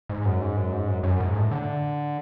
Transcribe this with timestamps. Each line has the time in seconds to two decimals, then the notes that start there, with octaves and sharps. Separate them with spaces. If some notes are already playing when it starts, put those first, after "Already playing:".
0.09 G#2
0.25 F#2
0.41 G#2
0.57 F#2
0.72 G#2
0.88 F#2
1.03 F#2
1.20 G#2
1.36 A2
1.51 D3